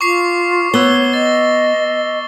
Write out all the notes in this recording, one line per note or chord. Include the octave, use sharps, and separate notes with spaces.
F4 C#6 D6 C7
B3 C#5 E6 G7
D#5 A6